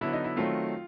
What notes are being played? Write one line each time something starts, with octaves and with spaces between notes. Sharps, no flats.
D3 F#3 B3 E4
D#4
E4
D#3 F#3 A3 C4 F4